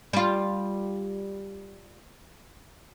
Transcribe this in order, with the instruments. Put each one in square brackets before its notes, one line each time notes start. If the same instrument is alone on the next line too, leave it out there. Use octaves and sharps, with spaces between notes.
[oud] G3 F4